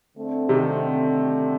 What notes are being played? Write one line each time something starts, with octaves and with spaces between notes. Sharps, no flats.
D3 A3 C4
C3 D#3